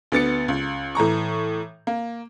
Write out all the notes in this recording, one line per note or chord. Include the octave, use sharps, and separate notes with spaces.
D2 B3 A6 C#7
C#2
A2 E3 A#5 C#6
A#3